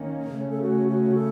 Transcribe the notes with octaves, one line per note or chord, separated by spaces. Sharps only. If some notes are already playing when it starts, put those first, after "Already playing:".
Already playing: D#3 A#3 C#4
C#3 A3 C#4
A4
F#4
F#4
A4